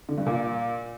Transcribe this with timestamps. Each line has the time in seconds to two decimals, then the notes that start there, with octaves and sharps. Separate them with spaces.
0.09 D3
0.18 G2
0.26 A#2